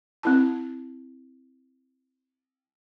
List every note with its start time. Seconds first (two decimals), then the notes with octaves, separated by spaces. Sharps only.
0.23 C4 E4 A5